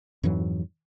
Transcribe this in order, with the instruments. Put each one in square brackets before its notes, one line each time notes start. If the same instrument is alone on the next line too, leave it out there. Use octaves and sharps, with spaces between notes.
[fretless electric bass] F2 G#2 E3 F#3